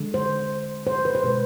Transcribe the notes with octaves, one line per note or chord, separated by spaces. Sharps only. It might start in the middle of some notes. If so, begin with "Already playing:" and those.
Already playing: D3 G#3
C5
C5
B4
C5
B2 G#3 B4